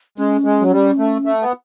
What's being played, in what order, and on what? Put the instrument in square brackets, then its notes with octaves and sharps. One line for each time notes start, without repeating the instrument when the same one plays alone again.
[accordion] G#3 [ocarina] C#4
[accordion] G#3
F#3
G3
A3
A3
B3